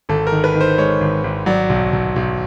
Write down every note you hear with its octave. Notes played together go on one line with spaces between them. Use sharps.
G#1 A4
A#4
D#3
B4
D#3
C5
G#3 C#5
G#1
G#1
F#3 D5
B1
B1
B1